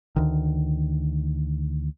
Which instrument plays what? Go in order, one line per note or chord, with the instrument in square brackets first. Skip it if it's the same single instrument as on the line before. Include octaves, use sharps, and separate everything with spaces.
[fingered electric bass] D2 D#3